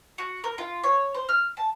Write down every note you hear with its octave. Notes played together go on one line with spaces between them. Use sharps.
F#4
A#4
F4
C#5
C5
F6
A5